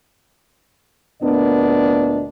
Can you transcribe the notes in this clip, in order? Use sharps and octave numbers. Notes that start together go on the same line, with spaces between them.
D2 A#2 B3 D4 A#4 D#5